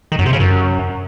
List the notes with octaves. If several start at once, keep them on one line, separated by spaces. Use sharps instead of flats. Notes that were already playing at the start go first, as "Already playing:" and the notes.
D#3
F#2
C3
C#3
F#2